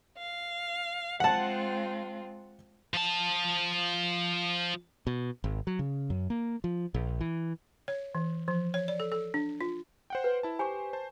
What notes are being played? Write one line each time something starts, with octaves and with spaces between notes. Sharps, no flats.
F5
G#3 C4 F4 F#5 A5
F3 A5
B2
G#1
F#3
C#3
F#2
A#3
F3
A#1
E3
C#5
E3
F3
C#5
D5
A4
A4
D4
F4
C5 F#5 G5
B4
E4 A5
G4 C5 G#5 C#6
C5 A5